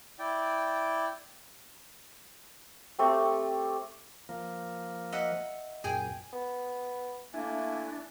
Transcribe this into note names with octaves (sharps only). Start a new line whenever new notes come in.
E4 D5 G5
A3 C4 G4
F3 A#3
D#5 E5 F#5
F#2 A#2 G#4 G5 G#5
B3
A3 A#3 D4 E4 G#5